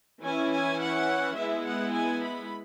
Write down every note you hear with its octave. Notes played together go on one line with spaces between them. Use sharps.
E3 C#4 E4 G#5
G#5
F#5
G#3 B3 E4 E5
F#5
G#5
B5